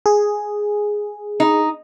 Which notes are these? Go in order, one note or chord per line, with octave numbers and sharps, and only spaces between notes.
G#4
D#4